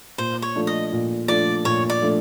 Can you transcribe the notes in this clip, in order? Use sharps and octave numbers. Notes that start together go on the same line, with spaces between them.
A#2 C5
C#5
F3 A3 D4
D#5
A#2
F3 A3 D4 D5
A#2 C#5
D5
F3 A3 D4